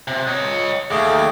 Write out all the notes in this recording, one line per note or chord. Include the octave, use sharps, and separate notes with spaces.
C3
C#5 D#5
D#2 A3 G#4 D6